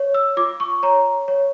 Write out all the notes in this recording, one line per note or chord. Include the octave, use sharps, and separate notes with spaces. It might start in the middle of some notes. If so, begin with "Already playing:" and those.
Already playing: C#5
E6
F4 D6
C#6
C#5 A#5
C#5